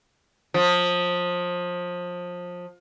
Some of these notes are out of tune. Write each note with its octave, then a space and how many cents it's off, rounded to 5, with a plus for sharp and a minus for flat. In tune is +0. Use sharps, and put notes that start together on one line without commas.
F3 +25